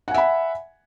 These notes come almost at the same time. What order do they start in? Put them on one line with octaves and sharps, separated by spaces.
F#5 G#5 E5 B5